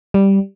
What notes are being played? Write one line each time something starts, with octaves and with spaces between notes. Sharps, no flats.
G3